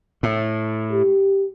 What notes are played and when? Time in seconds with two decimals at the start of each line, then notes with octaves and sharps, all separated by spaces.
0.23 A2
0.92 G4